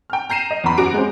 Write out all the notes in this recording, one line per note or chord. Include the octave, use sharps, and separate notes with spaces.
G5 F6
A#5 G6 C7 D#7 E7
D#5
E2 B5
F#2 F#4 A#5 D6 D7
G#3 C4 C5